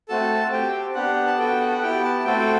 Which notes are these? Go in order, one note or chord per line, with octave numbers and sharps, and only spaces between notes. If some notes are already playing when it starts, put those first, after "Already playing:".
A3 C4 F#4 A4 A5
C4 G4 G5
B3 D4 G4 F#5
A5
B3 F#4 A4 G5
F#5
F#5
B3 E4 G4 G5
A5
A3 C4 F#4 A4 G5
G5